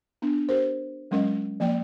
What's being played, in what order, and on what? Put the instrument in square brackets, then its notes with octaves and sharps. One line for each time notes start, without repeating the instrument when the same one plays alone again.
[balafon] B3 D4
G4 A#4 C5
F#3 G#3 C#4 A#4 D#5
F3 A#3 D5 G5